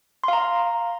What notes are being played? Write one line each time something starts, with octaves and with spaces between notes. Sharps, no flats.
F5 A#5 C6